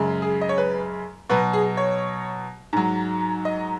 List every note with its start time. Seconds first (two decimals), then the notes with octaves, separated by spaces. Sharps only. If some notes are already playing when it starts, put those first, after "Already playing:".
Already playing: F#2 C#3 G#3
0.22 G#4
0.41 D#5
0.49 C#5
0.58 B4
1.30 B2 F#3 B4
1.53 G#4
1.77 C#5
2.73 G#2 F#3
3.45 D#5